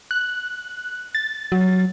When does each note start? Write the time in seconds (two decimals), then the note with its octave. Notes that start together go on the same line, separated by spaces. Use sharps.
0.11 F#6
1.15 A6
1.52 F#3